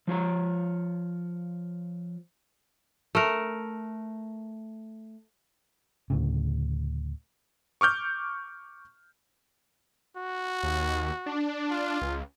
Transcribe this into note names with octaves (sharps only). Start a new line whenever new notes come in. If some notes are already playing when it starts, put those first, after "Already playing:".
F3 F4 C#5 A#5
A3 A#4
D2 A2 C#3
C#6 D6 F6 G6
F#4
D#2
D4
F4
C#2